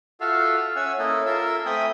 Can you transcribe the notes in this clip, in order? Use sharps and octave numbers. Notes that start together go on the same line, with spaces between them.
F4 F#4 A4 E5 F5
C#4 E5 F#5 G#5
A#3 C#4 E4 A4 D#5
F4 A4 A#4 E5 E6
A3 C4 G5 G#5 B5 D#6